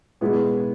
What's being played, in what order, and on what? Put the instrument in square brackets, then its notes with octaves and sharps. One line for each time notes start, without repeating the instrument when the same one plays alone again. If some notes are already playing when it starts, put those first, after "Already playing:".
[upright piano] B2 G#3 B3 E4 G#4